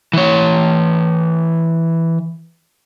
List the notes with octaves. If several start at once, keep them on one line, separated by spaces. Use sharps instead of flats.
E3 C#5